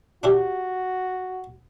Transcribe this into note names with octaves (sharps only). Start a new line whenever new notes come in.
D4 E4 F#4 G4